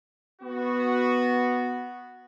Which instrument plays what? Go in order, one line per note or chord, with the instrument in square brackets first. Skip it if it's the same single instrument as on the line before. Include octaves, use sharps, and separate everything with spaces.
[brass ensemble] B3 F#4